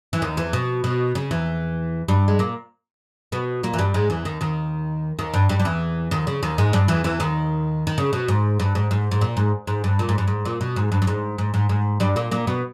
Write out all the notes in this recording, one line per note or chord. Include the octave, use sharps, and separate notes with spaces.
E3
D#2 D#3
E2 E3
B2
B2
C#3
E2 E3
G2 G3
G#3
A#2 A#3
B2 B3
A#2 A#3
E3
G2 G3
G#2 G#3
E2 E3
D#2 D#3
D#2 D#3
D#2 D#3
G2 G3
G2 G3
G3
E2 E3
D#2 D#3
C#3
D#2 D#3
G#2 G#3
G2 G3
E2 E3
E2 E3
D#2 D#3
D#3
C#3
B2
G#2
G2
G#2
G#2
G#2
A#2
G#2
G#2
G2
A#2
G#2
G2
G#2
A#2
B2
G#2
G2
G2
G#2
G#2
G#2
G#2
G2 G3
A#2 A#3
A#2 A#3
B2 B3